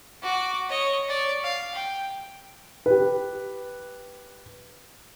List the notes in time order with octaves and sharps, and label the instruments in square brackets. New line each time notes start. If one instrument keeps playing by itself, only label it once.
[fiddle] F#4 D6
C#5 D#5
C#5 D5
F5
G5
[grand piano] G4 B4